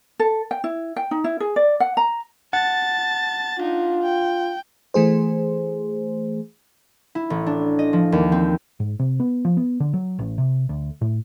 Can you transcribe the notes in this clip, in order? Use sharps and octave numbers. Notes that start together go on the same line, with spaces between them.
A4
G5
E4
G5
D#4
E4
G#4
D5
F#5
A#5
F#5 A5 A6
D4 D#4 F4
G5
E3 A3 G#4 C5
E4
A1
D4
D#5
F3
D#2
C4
G#2
C3
B3
F3
B3
D3
F#3
A1
C3
D2
A2